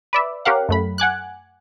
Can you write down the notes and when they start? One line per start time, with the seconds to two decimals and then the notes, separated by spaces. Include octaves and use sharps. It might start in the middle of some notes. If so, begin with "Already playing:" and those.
0.13 B4 D5 E5
0.45 C#4 G4 A#4 F5 F#5
0.69 F#2 A3 B5
0.98 F#5 G#5 D6 F#6